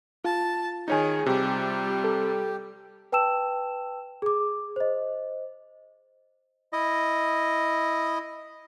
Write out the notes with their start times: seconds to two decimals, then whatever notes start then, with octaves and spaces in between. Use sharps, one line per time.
0.25 F4 A5
0.88 D#3 D#4 G#4 C#5 G#5
1.26 C3 G3 G4
2.04 A4
3.12 B4 G5 A5 E6 E7
4.22 G#4 D6
4.76 C5 D#5
6.73 E4 D#5